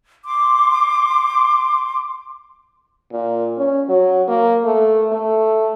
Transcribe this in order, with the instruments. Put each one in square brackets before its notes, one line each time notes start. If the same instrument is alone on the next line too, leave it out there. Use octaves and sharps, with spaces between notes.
[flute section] C6 D6
[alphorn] A#2
C#4
F#3
A#3
A3
A3